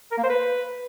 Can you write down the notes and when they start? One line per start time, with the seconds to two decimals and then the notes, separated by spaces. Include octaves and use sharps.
0.11 A#4
0.17 A#3
0.23 C5
0.30 B4